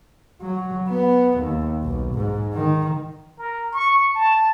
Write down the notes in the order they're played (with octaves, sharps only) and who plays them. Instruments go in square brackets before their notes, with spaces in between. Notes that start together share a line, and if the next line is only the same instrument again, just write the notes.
[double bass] F#3
B3
D#2
B1
G#2
D#3
[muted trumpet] A#4
C#6
A5